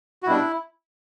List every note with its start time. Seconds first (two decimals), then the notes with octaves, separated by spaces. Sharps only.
0.23 F#4
0.27 B2 G3 D4 E4